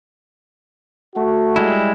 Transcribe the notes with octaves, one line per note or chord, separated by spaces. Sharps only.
A3 F#4
G3 G#3 E4